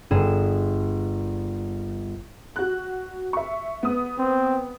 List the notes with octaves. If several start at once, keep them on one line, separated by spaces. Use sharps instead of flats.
G1 G#4 E7
F#4 F#6
E5 C#6
B3 D#6
C4